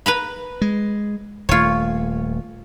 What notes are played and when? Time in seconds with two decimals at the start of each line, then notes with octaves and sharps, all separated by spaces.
0.06 B4 A#5 B5
0.61 G#3
1.49 D#1 A3 F4 C#5